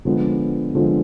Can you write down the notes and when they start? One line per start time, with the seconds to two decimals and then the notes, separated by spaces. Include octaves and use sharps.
0.05 D3 F3 G#3 B3
0.75 D3 F3 G#3 B3